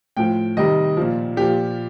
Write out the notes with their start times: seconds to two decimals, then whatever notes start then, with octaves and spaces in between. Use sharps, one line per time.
0.17 A2 F3 G5
0.57 C3 D#3 G3 D#5
0.97 A#2 F3
1.36 A#2 F3 G4